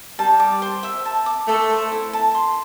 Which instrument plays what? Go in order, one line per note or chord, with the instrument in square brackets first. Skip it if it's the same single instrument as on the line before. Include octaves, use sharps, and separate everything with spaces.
[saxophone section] G3 [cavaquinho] A5
[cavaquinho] D6
C5
E5
A5
D6
[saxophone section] A3 [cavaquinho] A4
[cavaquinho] C5
E4
A5
C6